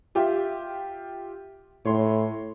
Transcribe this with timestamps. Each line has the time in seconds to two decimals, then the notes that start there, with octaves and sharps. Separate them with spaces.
0.15 F4 G4 E5
1.85 A2 C#5 C6